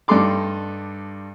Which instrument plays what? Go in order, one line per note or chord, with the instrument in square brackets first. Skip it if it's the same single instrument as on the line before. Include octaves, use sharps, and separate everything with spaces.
[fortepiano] G2 G3 D#4 A4 C6 D6